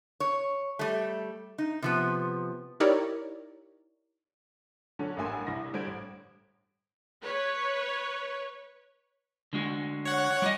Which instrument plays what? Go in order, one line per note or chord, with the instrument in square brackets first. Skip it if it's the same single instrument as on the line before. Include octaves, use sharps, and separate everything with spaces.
[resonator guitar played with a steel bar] C#5
G3 A3
D#4
C3 F3 B3
[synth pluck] D#4 E4 G4 A#4 C#5 D5
[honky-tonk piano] D3 F#3 C#4 D4
A1 G2 A#3 E5 G#5 C6
C2 E4 A#6
D3 G3 C5 G#6 D7
A1
[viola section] B4 C#5
[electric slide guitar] D3 G#3 F#4
[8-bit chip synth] C#5 F#5
[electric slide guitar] G3 F#4 D#5